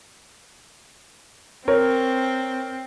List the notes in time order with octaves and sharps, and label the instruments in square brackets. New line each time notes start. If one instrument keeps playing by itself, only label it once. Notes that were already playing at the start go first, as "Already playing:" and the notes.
[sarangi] C4 [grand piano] A#4 C#5